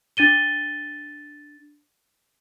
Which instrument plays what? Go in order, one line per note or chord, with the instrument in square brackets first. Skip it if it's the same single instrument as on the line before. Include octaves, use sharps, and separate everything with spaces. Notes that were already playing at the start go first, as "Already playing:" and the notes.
[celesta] D4 A6 D#7 G7